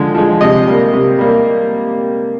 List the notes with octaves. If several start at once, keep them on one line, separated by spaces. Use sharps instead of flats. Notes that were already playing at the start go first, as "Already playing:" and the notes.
Already playing: D3 F3 G#3
F3 G#3
C3 D#5
G3 A#3
C3
G3 A#3